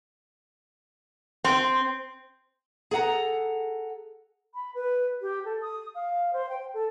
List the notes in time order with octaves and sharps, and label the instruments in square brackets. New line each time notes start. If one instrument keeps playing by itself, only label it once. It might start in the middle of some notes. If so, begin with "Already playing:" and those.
[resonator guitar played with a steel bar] C4
[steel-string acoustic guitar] G#4 A4 F#5 A#5
[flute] B5
B4
G4
A4
D#6
F5
C5
G5
A4